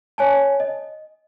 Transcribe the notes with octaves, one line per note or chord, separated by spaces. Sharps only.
C#5 G#5 A5
D#5